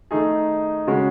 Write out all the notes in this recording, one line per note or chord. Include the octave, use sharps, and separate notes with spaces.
D#3 A3 D#4 G#4
C#3 G#3 C#4 F#4